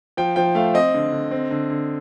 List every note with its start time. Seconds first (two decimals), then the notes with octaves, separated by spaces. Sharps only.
0.17 F3 G5
0.36 F3 G5
0.55 A3 F5
0.74 C4 D#5
0.94 D3
1.12 D3
1.31 C4
1.51 D3
1.70 D3